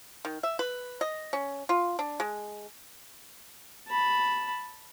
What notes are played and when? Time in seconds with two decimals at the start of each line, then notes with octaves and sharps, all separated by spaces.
0.25 D#3
0.43 E5
0.59 B4
1.01 D#5
1.33 C#4
1.69 F4
1.99 D4
2.20 G#3
3.88 A5 B5